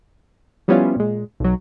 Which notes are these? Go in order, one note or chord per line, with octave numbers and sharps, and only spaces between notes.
F3 G3 B3 C#4 E4 F4
A#2 G#3
B1 F#3